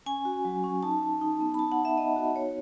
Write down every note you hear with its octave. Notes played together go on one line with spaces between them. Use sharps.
C#4 G#5
F#4
F#3
C#4
D#4 A5
D#4
D#4
B3
B5
D#4 A5
F#5
B3
E5
B3 D#5
F#4
D#4 C#5